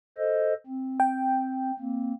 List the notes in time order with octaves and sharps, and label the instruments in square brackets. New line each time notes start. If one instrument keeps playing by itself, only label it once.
[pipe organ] A4 C5 D#5
C4
[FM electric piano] G5
[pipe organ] A#3 C4